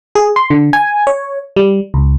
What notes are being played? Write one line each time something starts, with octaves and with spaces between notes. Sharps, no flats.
G#4
C6
D3
G#5
C#5
G3
C#2